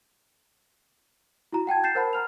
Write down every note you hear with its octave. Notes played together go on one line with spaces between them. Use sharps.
E4 F#4 A#5
F#5 G5 A5 G#6
G6 A6 C7 E7
A#4 C5 F#5 A5 B5
A#5 F6 F7